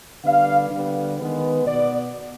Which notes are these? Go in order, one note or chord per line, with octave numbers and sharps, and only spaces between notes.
D3 G3 B3 F5
D3 G3 B3
D#3 G#3 B3
B2 B3 D5